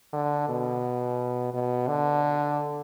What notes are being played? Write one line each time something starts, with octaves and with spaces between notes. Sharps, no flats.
D3
B2
B2
D3